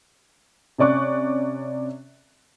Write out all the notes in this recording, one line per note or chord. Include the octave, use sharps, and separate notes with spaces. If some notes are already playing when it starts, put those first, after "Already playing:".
C3 C#4 D5 C#6 F#6